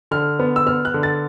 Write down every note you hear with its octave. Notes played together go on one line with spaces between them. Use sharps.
D3 F6
B3
E6
B3 F6
F#6
D3
A6